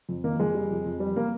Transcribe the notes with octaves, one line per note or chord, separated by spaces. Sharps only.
F2
D#3 A#3
F2 G#3
G3
F2
F2
G3
A#3